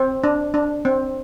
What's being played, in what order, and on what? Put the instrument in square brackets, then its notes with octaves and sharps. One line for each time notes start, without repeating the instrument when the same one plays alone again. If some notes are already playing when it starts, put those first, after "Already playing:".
Already playing: [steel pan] C4
D4
D4
C4